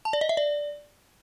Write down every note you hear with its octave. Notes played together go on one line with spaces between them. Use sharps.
A5
D5
D#5
E5
D5